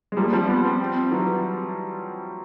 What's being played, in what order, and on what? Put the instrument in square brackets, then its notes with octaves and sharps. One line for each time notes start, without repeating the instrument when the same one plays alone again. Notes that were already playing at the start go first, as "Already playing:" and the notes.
[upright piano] G#3
[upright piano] F3 G3 [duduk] A#3
[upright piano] F3 G3
[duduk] B3
C4
C4
[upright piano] E3 F#3